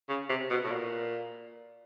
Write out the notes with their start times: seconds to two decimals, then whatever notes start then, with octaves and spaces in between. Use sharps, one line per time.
0.09 C#3
0.29 C3
0.51 B2
0.64 A2
0.71 A#2